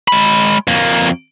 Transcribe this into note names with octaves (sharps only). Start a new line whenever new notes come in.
G#3 B5
F2 A#3